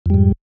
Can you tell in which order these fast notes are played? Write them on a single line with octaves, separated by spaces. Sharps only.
F2 G3 G#2